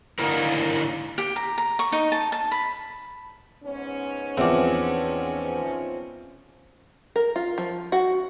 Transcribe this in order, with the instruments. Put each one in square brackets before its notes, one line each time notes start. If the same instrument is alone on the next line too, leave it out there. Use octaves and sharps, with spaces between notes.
[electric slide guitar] D3 A#3 D#4 E4 A#4
[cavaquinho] G4
A#5
A#5
C#6
D#4
A5
A5
B5
[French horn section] G#2 B3 C#4
[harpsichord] E2 D5 [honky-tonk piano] F3 C4
[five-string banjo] A#4
F4
F3
F#4